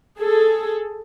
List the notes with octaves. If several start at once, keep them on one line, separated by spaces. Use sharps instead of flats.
G#4 A4